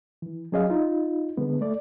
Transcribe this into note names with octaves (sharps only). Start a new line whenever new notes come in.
E3
F#3 C#4 G#4 D#5 F5
D#4 F4
D3 G#3 B3
A3 D5